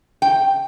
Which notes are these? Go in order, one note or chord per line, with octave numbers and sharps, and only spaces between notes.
G5